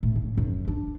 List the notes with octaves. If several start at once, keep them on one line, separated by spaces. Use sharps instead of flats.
A2
C#3
F#2
D4